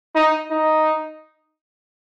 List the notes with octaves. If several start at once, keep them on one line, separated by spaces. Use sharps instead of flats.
D#4
D#4